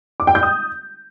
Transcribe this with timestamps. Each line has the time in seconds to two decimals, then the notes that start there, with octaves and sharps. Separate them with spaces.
0.20 D6
0.27 G5
0.35 G6
0.43 D#6